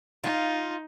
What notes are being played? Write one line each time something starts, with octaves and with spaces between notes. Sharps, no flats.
D#4 F4